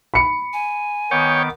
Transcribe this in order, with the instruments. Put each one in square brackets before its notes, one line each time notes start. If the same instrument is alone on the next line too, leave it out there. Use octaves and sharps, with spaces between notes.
[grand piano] B5 C#7
[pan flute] G#5
[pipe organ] D#3 B3 D6 [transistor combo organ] C#5 G5